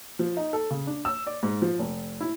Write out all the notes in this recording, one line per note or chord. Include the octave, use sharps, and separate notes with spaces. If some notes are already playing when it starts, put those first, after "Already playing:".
F3
D#4
A4
C#3
D4
E6
D5
G#2
F3
F1
E4